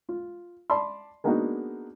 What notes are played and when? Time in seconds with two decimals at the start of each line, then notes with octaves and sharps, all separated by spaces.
0.09 F4
0.70 D5 A5 B5 C6
1.24 G#3 A#3 B3 D4 D#4 F#4